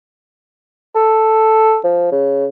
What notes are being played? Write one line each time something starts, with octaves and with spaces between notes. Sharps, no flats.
A4
F3
C#3